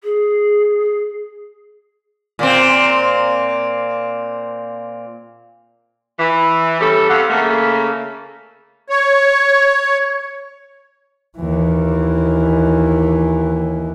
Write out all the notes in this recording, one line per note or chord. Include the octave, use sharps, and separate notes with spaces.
G#4
A#2 A#3 C4
E3
G3 A3 C#4 G4 A4
E2 C3 G4 A4 F5 F#5
C#3 A3 A#3
C#5
D#2 E3